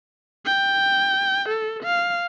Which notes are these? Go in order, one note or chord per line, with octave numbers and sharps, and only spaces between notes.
G5
A4
F5